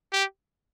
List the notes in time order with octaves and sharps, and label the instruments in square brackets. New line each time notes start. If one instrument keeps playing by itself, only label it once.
[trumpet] G4